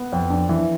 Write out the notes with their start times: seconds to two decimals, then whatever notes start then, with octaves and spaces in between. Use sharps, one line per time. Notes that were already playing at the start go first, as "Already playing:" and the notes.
Already playing: B3
0.12 F2
0.30 D4
0.49 E3